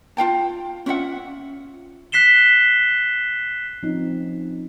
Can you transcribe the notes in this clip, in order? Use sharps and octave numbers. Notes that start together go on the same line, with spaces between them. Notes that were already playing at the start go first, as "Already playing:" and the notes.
F4 F5 G5 A5
C#4 F4 E5 F#5
F#6 B6 C7 E7 G7
F3 C4 C#4 D#4